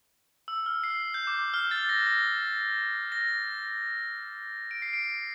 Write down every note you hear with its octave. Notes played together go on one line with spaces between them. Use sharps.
E6
F6
C7
G6
D6
F6
A6
A#6
A#6
A#6
D7
C7
D7